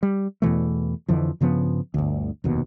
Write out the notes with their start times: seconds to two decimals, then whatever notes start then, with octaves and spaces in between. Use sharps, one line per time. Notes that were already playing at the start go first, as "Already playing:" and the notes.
0.03 G3
0.42 E2 B2 E3 A3
1.08 F2 D3 E3 F3
1.41 G2 C#3 F3 B3
1.94 G1 D2
2.44 F1 D#2 B2